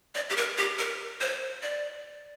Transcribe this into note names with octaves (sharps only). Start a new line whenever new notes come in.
D5
G4
A#4
G4
A#4
C5
D5